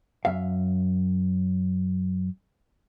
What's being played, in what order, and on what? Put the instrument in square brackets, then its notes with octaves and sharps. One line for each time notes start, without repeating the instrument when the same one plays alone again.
[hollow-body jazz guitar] F#2 E5 F5